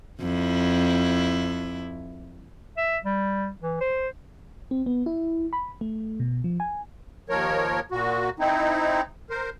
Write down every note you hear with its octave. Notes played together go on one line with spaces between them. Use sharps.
F2 E4
E5
G3
E3
C5
C4
B3
E4
B5
A3
B2
F3
G#5
D#2 F3 A#4 C#5
A#2 F#4
C4 D#4 E4
A#4 C5